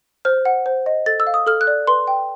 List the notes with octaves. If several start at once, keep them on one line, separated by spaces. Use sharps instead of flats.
C5 F6
F#5
C5
D#5
A4 A6
E6
F5
D#6
A4 F6
F#6
D5
B4 C6
G5